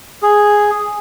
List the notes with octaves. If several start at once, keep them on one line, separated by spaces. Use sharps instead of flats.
G#4